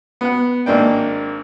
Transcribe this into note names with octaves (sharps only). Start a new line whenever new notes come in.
B3 F#5
G#1 A#3 D4 G5